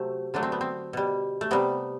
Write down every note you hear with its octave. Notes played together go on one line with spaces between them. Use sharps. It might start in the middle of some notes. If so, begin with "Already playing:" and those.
Already playing: C3 F#3 A3 C4
D3 F#3 A3 D4
C4
B3
C4
B2 G3
A3
C3 G3 B3